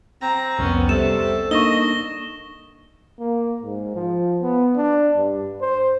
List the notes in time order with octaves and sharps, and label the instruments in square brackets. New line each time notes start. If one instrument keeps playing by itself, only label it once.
[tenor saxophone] C4 [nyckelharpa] A#5
[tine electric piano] C2 F2 [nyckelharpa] B3 C#4
[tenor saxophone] C3 [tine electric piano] G3 [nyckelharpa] A4 [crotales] E7
[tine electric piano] A#3 D4 D#4 [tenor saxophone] D#5 [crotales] C#6 A#6 G7
[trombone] A#3
G#2
F3
B3
D4
G2
C5